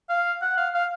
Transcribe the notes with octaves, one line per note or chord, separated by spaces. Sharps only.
F5
F#5
F5
F5